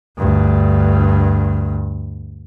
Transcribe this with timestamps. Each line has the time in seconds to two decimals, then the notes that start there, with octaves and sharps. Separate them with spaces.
0.18 D2 G2